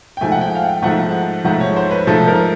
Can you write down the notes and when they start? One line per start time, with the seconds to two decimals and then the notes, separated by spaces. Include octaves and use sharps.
0.17 G5
0.21 G#2 F3 A3 G#5
0.32 F#5
0.41 G5
0.55 F5
0.63 F#5
0.83 G#2 F3 A3 F#5
1.44 G#2 F3 A3 F#5
1.60 C#5
1.76 C5
1.91 B4
2.07 G#2 F3 A3 A4
2.27 A#4